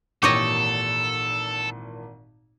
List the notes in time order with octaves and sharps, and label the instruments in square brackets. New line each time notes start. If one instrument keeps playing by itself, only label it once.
[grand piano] G#1 A#2 E3 [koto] G4 C#5 D#5 [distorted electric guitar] A4